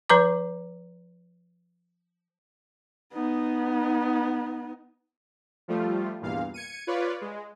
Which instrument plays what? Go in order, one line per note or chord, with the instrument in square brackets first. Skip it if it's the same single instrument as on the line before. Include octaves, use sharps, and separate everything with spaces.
[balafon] F3 B4 A#5 D6
[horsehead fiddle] B3 D#4
[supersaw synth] F3 G3 A3 F4
E2 G2 A#2 F5
G#6 C#7 D#7
F4 B4 C#5 D5
G#3